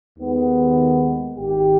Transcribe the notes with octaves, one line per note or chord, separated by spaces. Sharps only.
D#2 D#3 G#3 B3
G#1 G#2 D#3 G4